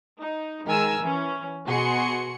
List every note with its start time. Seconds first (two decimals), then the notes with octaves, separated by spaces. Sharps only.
0.20 D#4
0.68 D#3 G#3 A#4 G#5 E6
1.01 E3 C#4
1.67 B2 F#4 G#4 C6 C#7